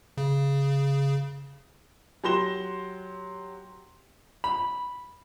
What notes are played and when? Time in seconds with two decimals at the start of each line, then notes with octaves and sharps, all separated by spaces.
0.17 C#3
2.24 F#3 G4 C6 A#6 E7 G7
4.44 B5